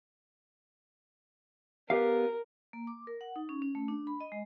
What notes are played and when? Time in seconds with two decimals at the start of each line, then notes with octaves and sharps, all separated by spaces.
1.90 B3 G4 A#4 F5
2.73 A#3
2.87 D6
3.07 A#4
3.21 F#5
3.36 D#4
3.49 C#4
3.62 C#4
3.75 A3
3.88 D4
4.07 B5
4.20 D#5
4.32 G#3